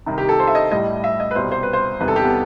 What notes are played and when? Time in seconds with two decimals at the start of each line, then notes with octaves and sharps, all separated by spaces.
0.06 C2 C3 D#3
0.18 G4
0.29 A4
0.40 C5
0.47 E5
0.55 D#5
0.71 A2 G3 D#5
1.04 E5
1.20 D#5
1.31 B4
1.35 C2 B2 G3 C5
1.52 C5
1.63 B4
1.73 C5
2.00 E2 C3 D#3 G3 B4
2.08 A4
2.16 G4
2.24 B3